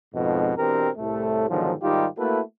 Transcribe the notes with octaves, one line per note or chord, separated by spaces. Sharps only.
F2 G#2 B2
B2 E3 C4 D4 G4 A#4
C2 A2 A3
G#2 B2 D3 D#3 F3 F#3
G#2 D#3 G3 D#4 F4 G4
A3 A#3 E4 F#4 A4 B4